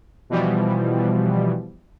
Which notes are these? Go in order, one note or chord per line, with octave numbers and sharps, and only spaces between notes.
B2 E3 F3 G3